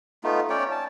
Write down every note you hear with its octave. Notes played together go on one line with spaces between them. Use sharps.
A3 B3 D#4 F4
C#4 C#5 D5 G5
A5